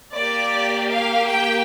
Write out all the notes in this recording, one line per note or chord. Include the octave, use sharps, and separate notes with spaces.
A#3 G4 D5
F5
G5